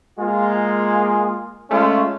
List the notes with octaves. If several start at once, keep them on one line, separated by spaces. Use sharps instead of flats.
G#3 A#3 F4 G#4
G#3 A3 C#4 F4